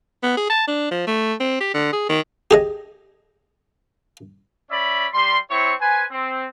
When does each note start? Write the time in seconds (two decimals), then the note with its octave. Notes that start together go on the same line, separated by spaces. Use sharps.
0.23 B3
0.37 G#4
0.50 A5
0.67 D4
0.91 F3
1.07 A3
1.40 C4
1.61 G4
1.74 D3
1.93 G#4
2.09 D#3
2.51 G4 G#4 D#5
4.71 C#4 D5 E5 B5
5.14 G3 C6
5.50 C4 E4 C#5 C#6
5.81 B4 C5 G#5
6.11 C4